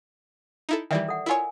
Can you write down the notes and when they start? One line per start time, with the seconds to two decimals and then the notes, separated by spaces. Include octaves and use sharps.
0.69 D#4 E4 A4
0.91 D#3 E3 G3 D5 E5 G5
1.08 A4 F#5
1.26 E4 F4 A#4 C#5 G#5